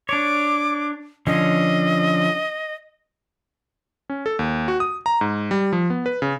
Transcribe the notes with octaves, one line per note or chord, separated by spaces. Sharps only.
D4 C#5 D6
D3 F3 C#4 D#5
C#4
A4
D#2
F#4
D#6
A#5
G#2
G3
F3
B3
B4
C#3